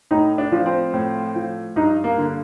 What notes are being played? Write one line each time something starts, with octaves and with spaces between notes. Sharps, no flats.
A2 D#4
D4
F3
C4
A2
F3
G2 D#4
A#3
D3